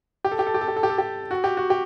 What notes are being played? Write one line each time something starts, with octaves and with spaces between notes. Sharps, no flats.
G4
A4
G4
A4
G4
A4
G4
A4
G4
A4
G4
F#4
G4
F#4
G4